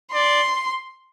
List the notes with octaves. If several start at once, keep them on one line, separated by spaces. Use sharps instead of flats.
D5 C6